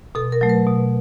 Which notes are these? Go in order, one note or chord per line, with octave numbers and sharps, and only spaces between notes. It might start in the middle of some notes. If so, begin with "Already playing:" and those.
B2 A4
A#4
F#3 A3
B4
B2